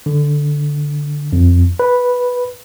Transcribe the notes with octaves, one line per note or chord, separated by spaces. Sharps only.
D3
F2
B4